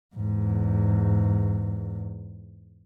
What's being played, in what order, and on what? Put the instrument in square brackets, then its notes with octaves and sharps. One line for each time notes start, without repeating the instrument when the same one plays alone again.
[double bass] E2 G#2